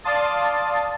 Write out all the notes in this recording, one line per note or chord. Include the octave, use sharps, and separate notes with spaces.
D5 F5 A5 C6 D#6 A6